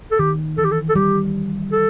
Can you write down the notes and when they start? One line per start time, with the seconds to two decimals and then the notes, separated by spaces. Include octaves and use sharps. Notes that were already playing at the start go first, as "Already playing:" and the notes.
0.11 A4
0.19 D#3 G4
0.57 E3 A4
0.64 G4
0.71 A4
0.89 A4
0.95 G3 G4
1.72 A4